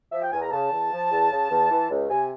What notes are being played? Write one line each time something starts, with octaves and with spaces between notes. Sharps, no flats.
F3 E5
G5
E2 G#5
A#5
C#3 A5
E2
F3
E2
C#3
E2
E3
C#2
C3 G#5